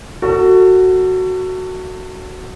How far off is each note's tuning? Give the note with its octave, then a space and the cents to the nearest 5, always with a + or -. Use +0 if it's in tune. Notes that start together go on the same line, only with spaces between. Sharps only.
F#4 +5 A4 +30